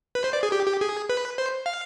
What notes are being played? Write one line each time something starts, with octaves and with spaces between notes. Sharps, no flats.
B4
C5
D5
G#4
G4
G4
G#4
B4
C5
F5